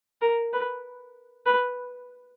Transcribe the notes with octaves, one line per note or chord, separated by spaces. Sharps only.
A#4
B4
B4